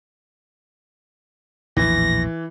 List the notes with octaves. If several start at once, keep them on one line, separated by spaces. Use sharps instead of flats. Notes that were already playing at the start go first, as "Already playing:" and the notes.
A#1 E2 A2 E3 A#6